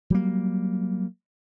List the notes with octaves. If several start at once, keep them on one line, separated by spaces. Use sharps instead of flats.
F#3 G3 A#3